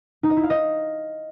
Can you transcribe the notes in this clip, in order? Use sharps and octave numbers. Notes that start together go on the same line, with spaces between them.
D#4
D#5
E4
F5
D#5